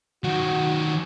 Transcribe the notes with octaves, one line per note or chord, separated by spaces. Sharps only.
D#3 F#3 F#4